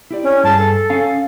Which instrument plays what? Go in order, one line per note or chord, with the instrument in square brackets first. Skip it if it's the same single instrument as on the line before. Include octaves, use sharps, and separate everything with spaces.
[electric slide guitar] E4 G4 D5
[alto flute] C#4
[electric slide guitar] G2 G#4 [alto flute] A5
[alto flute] A4
[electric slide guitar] C#4 F5 G#5